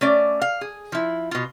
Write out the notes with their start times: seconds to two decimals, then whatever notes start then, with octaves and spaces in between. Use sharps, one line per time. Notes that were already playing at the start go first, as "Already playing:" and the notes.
0.01 A3 C#4 D5
0.42 F5
0.61 G#4
0.92 F3 E4
1.31 B2 F4